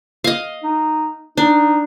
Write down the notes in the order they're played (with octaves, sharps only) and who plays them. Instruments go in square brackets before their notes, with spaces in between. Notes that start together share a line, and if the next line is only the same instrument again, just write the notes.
[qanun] D#5 F5
[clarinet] D#4
[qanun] D4 [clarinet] D#4